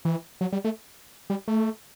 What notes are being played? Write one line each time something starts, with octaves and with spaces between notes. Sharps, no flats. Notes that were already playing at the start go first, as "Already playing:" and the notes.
E3
F#3
G3
A3
G3
A3